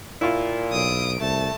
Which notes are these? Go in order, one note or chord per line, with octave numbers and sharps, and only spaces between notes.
A#2 E4 F4
B1 D#6 D7
C2 A3 A5